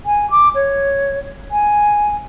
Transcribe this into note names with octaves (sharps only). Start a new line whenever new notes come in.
G#5
D6
C#5
G#5